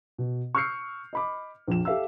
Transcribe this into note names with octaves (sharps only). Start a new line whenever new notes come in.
B2
C#6 E6 F6 G6 C7 C#7
D#5 B5 D6
A#1 F2 E7
G4 A4 E5 F5 E6